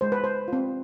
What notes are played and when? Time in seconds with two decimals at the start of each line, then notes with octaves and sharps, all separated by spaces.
0.01 G#3 C5
0.12 B4
0.24 C5
0.48 C4 F4